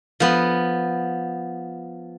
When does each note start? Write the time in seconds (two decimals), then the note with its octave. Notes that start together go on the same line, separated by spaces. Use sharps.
0.20 F3 B3